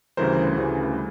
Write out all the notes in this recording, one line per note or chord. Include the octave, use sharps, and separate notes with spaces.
D2 C#3 E3 G3 A#4 C5
D2 C#3 E3 G3